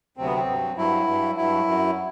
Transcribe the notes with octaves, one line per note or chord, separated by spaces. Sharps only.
D2 C3 F#3 C4
B3
C4
G2 F#3
G2 F#3 E4
G2 F#3
G2 F#3 E4
F#2 F#3